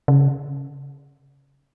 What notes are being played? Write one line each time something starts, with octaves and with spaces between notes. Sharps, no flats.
C#3